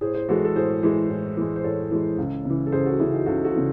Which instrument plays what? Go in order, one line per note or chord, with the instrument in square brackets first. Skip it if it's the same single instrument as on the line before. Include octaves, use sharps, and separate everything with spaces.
[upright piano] A2 G#4 C5
G#4 C5
E3 G#3 F#4 A4
A4
A2 G#4 C5
E3 G#3
A2
E3 G#3
C5
A2 A4 C#5
E3 G#3
C#2
C#3 E3
A4
C#2 G#4 C5
F#4 A4
C#3 E3 E4 G#4
D#4 F#4
C#2 F#4 A4
F#4 A4
C#3 E3